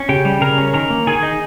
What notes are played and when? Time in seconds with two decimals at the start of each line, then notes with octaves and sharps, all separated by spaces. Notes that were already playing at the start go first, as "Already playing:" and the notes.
Already playing: C#4
0.09 C#3 G4 G5
0.25 G3
0.41 C#3 A#4 A#5
0.58 C#4
0.74 D#3 A#4 A#5
0.90 A#3
1.07 D#3 G#4 G#5
1.23 D#4